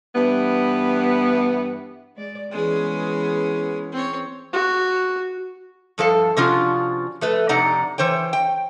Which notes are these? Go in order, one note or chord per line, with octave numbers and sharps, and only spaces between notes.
G2 E3 B3
G#3 D5
E3 G#3 B3 C#4 G#4
C4 C#5
F#4
G2 F3 A4 F5 A5
C3 F3 C#4 D4 F4 F#4
F3 A3 B4
F2 C3 D#4 D5 F#5 A#5
E3 C5 C#5 G5
G5